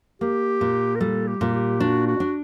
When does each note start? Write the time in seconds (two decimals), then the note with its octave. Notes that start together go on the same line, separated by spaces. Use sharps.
0.21 A#3 G4
0.61 A#2
0.96 A#4
1.00 G3 A4
1.27 G4
1.41 A#2
1.54 G4
1.80 D4 F#4
2.07 F#4
2.20 D4